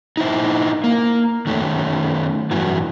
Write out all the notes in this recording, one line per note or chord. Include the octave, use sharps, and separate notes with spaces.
D#4 E4 C5
A#3
D#3 A3 C#4
G2 E3 F#3